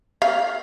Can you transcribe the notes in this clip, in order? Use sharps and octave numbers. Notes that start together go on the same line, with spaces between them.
F5